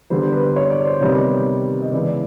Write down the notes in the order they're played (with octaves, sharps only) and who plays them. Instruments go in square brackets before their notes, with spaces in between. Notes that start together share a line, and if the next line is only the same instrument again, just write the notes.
[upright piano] D3 G3 B3 C5
B4
C#5
D5
C5
C3 D#3 G3 B3 C#5
D#5
C#3 E3 G#3 B3 D5